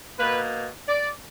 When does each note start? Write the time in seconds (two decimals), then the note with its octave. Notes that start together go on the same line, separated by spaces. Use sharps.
0.18 B2 A#3 B4
0.88 D5